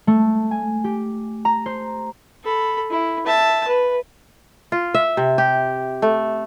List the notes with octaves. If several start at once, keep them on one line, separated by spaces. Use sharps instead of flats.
A3
G#5
G4
A#5
C5
A4 B5
E4
E5 A5
B4
F4
E5
C3
G4
A3